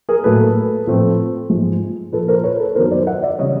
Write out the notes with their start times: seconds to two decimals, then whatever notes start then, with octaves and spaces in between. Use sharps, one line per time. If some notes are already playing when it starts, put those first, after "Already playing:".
0.09 G#4 A#4
0.24 A2 F#3 A#3 A4 B4
0.87 A2 F3 A3 C4
1.50 G#2 F3 G#3
2.12 A#2 F3 A#3 A4 B4
2.28 A#4 C5
2.44 B4 C#5
2.59 A4 B4
2.75 F#2 D#3 F#3 B3 A#4 C5
2.91 C5 D5
3.07 E5 F#5
3.22 D5 E5
3.39 C#3 E3 G3 C#5 D#5